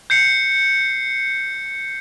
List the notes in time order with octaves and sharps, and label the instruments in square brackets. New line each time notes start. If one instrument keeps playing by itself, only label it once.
[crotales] G6 C7 C#7